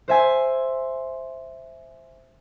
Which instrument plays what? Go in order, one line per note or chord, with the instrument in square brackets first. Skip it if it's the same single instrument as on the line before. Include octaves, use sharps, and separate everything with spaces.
[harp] C5 E5 G#5